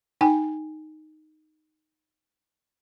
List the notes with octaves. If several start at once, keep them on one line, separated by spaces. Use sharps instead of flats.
D#4 G5 G#5